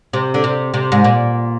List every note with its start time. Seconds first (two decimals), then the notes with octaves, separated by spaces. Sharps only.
0.13 C3
0.34 D3
0.44 C3
0.74 C3
0.92 G#2
1.04 A#2